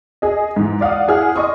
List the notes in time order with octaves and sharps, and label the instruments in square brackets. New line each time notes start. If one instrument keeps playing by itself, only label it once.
[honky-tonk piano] G#4 D#5
G#2 E3
D5 F5 F#5 D#6
E4 G#4 F#5 F6
D5 D#5 C6 C#6 D#6